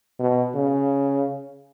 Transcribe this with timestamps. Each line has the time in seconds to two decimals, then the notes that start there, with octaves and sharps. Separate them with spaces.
0.20 B2
0.54 C#3